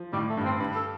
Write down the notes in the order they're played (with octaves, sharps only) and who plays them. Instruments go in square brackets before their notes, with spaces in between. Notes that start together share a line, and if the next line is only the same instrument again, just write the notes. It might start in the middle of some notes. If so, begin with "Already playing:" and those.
Already playing: [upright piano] F3
[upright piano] A2 [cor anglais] G3
[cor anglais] A3
[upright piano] G2
[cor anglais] C4
[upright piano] G2 [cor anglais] B4
[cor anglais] A4